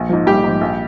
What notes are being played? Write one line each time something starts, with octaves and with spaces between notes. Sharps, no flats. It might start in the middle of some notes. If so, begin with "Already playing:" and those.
Already playing: A#1
G#2 F3
A#1 G3 G4
G#2 F3
A#1